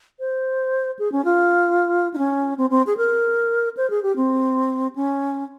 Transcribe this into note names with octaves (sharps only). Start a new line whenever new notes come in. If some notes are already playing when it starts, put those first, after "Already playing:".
C5
G#4
C#4
F4
D#4
C#4
C4
C4
G#4
A#4
C5
G#4
G4
C4
C#4